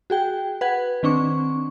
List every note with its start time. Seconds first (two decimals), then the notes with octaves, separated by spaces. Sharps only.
0.10 F#4 G#4 G5
0.61 B4 F#5 G#6
1.03 D#3 C4 D4 C#6